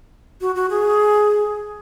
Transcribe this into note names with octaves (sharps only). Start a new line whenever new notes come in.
F#4
F#4
G#4